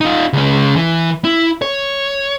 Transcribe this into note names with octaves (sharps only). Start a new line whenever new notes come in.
D#4 F4
C#2 C#4
E3
E4
C#5